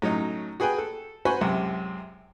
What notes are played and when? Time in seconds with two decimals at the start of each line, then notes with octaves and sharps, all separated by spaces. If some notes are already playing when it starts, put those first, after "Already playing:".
0.02 A2 F#3 C#4 D#4
0.60 F#4 G#4 B4 G5 G#5
0.78 A4
1.25 F#4 B4 C5 G#5 B5 C#6
1.41 C#2 F#2 C3